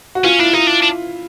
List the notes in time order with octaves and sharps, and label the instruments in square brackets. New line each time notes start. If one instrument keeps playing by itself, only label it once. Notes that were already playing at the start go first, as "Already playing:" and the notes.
[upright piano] F#4
[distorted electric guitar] C#4 [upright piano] F4
[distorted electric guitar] D4 [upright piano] E4
[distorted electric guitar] D#4 [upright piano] F4
[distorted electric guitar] D4
D4